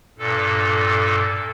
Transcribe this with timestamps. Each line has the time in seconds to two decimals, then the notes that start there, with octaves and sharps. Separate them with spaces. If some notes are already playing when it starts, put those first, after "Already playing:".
0.19 G2 A#2 A4